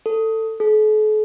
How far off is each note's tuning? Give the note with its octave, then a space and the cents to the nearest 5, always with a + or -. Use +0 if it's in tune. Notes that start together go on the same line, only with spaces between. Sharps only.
A4 +20
A4 -45